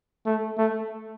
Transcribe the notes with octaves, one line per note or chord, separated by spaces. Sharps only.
A3
A3